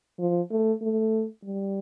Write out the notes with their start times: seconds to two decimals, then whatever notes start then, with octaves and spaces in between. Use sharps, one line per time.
0.19 F3
0.51 A3
0.82 A3
1.44 G3